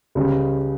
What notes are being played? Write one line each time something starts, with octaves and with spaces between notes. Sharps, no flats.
C#2 C#3 G3